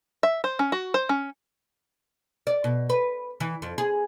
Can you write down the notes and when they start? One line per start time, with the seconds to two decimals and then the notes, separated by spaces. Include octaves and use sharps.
0.23 E5
0.44 C5
0.59 C#4
0.72 F#4
0.94 C5
1.09 C#4
2.47 D5
2.64 B2
2.90 B4
3.40 E3
3.62 F2
3.78 G#4